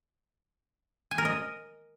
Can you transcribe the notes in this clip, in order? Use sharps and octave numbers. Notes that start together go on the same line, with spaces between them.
G#5
A#4
D#5